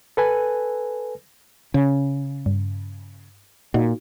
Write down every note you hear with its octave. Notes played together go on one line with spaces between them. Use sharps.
A4 B4 G#5
C#3 C#4
G2
A#2 D#4 F#4